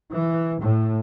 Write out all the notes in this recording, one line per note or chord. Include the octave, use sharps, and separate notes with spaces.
E3
A2